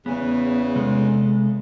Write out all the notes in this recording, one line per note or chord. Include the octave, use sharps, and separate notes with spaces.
E2 C#3 B3
C3 G#3 A4